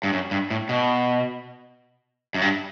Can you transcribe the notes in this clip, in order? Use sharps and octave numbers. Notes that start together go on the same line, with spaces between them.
G2
F#2
G2
A2
B2
F#2
G2